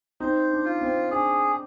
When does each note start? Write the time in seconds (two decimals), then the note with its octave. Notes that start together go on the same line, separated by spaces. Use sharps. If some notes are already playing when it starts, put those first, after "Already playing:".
0.20 C4 D#4 C5
0.51 D4
0.65 F4
0.81 C4
1.11 D4 G#4